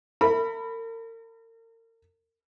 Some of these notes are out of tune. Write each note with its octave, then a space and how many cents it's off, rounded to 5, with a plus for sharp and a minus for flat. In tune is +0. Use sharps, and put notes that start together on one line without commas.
A#4 -40 B5 +0